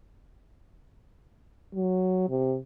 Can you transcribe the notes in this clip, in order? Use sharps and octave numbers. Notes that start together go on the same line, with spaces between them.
F#3
C3